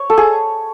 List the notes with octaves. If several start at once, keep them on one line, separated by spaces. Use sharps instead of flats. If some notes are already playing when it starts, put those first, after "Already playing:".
Already playing: C#5
A4
G#4